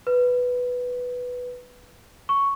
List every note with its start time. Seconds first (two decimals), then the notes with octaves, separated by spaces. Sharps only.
0.07 B4
2.29 C#6